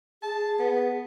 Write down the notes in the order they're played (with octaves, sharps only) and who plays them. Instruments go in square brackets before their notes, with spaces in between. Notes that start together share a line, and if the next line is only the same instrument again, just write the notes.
[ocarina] G#4 [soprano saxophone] A5
[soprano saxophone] B3